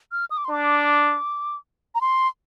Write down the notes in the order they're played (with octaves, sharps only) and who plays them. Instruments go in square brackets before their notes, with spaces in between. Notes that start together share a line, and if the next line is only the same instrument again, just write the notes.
[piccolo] F6
D#6
D6
C6
[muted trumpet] D4 [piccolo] D6
[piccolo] A#5
C6